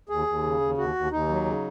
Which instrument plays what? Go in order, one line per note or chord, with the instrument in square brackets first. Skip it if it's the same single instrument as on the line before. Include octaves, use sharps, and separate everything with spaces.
[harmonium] D#2 G#4
D#2
C#3
D#2
D#2 F#4
D#2
D#2 D#4
F#3
C#3